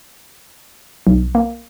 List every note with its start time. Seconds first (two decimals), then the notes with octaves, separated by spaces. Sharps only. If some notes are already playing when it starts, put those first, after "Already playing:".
1.07 B1
1.35 A#3